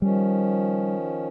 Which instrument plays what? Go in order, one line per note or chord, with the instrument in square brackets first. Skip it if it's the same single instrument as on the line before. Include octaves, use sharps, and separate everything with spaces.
[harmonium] D#3 F3 C#4 [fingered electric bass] G3